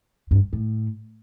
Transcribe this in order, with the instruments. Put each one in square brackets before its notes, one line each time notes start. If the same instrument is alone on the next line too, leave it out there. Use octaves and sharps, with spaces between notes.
[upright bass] G2
A2